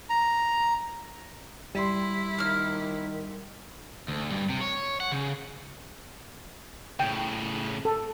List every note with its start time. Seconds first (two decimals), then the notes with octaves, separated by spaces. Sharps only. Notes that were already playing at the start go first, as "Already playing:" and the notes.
0.10 A#5
1.75 G3 E4 C6
2.39 D#3 A#3 F6
4.08 D2
4.31 G2
4.50 C3
4.61 C#5
5.00 F#5
5.12 C#3
7.00 A2 C#3 G5
7.85 A4